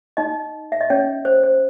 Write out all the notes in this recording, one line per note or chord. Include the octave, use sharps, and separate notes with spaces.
D#4 D#5
E5
D#5
C#4 C#5
C5
C5